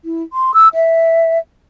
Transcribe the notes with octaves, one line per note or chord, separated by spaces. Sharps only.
E4
C6
E6
E5